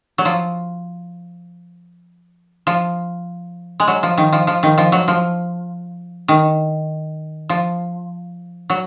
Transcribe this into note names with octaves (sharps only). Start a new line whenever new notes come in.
F#3
F3
F3
G#3
F#3
F3
D#3
F3
F3
D#3
F3
F#3
F3
D#3
F3
F#3